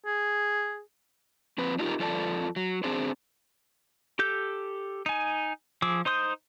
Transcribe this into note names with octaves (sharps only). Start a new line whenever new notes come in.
G#4
F3 C4 B4
D4 D#4 F4 G4 A#4
F2 F4 A4 D5 A5
F#3
C4 D4 G#4 C5 D5
G4 A4 G6
D#4 G#5
F3 G#4 D6 E6
D#4 C5 C6 D#6 G6